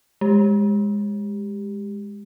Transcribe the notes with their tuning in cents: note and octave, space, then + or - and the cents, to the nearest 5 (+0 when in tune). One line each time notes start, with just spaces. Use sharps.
G#3 -15 G4 +5